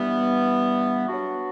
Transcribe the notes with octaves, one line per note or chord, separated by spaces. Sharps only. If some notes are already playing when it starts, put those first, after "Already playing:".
Already playing: G2 E3 G3 B3
F#3 B3 D4 F#4